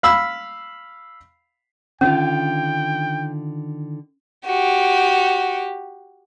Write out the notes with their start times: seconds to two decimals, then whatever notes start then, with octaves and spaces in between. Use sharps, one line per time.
0.03 F5 B5 E6
2.01 D3 D#3 C#4 F4 G5
4.46 F#4 G4